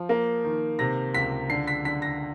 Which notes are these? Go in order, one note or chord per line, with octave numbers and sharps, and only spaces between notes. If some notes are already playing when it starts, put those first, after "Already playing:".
Already playing: F3
A#3
D#3
C3 A#6
C#2 B6
D3 C7
B6
D3 B6
A#6